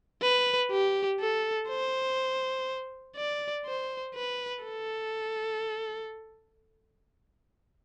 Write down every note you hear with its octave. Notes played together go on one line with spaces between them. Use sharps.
B4
G4
A4
C5
D5
C5
B4
A4